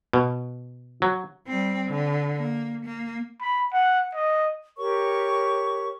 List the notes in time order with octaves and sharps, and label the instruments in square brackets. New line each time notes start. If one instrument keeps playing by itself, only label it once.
[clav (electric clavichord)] B2
F#3
[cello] G3 C4
D3
A#3
A#3
[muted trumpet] B5
F#5
D#5
[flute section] G4 A#4 C#5 C#6